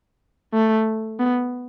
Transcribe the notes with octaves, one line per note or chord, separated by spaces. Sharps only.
A3
B3